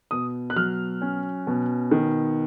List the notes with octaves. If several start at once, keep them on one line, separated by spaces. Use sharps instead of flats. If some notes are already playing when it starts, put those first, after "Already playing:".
B2 D#6
F#6
F#3 F6
C#4
B2
D#3